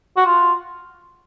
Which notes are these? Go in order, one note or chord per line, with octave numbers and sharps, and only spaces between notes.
F#4
F4